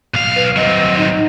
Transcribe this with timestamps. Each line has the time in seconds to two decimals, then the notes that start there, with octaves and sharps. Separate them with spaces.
0.14 B1 F5
0.36 B4
0.56 F#3 C4 D#5
0.97 D#4